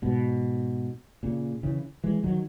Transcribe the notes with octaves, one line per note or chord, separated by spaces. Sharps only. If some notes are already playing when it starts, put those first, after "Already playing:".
G#2 B2
A#2 C#3
C#3 E3
E3 G#3
D#3 F#3